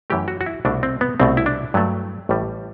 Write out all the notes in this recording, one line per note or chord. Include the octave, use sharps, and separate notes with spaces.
F#2 E3 A3 G4
F#4
F#4
E4
C2 B2 A3 D4
C4
B3
C2 B2 A3 C4
E4
D4
G2 F#3 A3
A1 A2 G3